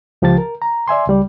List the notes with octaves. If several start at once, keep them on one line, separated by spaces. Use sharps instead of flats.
C#2 F3 G4 A5 A6
A#4
A#5
D5 E5 G#5 C6
C#2 G3 D5